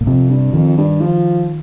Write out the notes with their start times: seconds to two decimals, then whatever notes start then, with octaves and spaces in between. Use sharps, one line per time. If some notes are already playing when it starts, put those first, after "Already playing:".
0.01 A#2
0.07 F2 C3
0.30 G2
0.54 F2 D#3
0.78 G2
1.01 F3